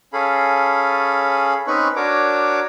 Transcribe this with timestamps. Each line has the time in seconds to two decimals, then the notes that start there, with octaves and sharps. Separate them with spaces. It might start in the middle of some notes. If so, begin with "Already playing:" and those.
0.13 C#4 G#4 A4 F5 B5
1.67 C4 C#4 D#4 B4 B5 C#6
1.96 D4 F#4 A#4 C#5 D6